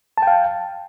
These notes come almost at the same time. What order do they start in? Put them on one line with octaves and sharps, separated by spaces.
A5 G5 F5